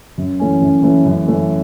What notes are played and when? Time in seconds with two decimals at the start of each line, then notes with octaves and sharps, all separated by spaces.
0.18 F#2
0.40 E3 A3 C#4
0.62 F#2
0.83 E3 A3 C#4
1.06 F#2
1.27 E3 A3 C#4